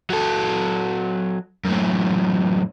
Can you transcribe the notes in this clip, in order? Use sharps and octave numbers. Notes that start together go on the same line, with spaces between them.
F#3 A4
F#2 A2